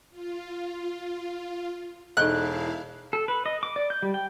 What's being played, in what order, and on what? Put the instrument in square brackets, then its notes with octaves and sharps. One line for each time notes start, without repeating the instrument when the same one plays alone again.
[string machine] F4
[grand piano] E1 [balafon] D#4 A4 D#5 [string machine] E4 F5 [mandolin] F#6
[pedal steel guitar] A4
B4
D#5
D6
D5
G6
G3
G5